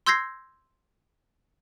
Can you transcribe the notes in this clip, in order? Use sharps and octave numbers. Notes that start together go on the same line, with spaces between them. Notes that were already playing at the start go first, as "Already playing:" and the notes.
C6 E6 G6 G#6 A#6 C7